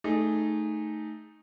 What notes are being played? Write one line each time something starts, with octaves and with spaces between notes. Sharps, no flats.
A3 D#4 G#4